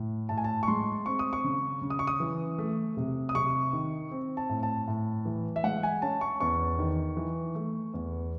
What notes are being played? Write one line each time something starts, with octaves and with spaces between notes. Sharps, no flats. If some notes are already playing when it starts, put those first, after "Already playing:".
Already playing: A2
A2 A5
G#5
A5
C#6
G#3 C6
C4 C#6
D#6
C#6
C#3
C#3
D#6
C#6
D#6
E3
A3
C3
D#6
C3 C#6
D#3
C4
A5
A2
A5
A2
E3
E5
G#3 F#5
G#5
C#4 A5
C#6
E2 C#6
D#3
E3
A3
E2